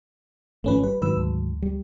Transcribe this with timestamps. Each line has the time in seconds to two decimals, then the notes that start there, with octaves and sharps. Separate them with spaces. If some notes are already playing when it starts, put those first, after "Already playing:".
0.64 G#1 F3 A3 C#4 B4
0.83 G3 B4
1.02 G#2 D#3 F#3 B4 E6
1.16 D2
1.62 G3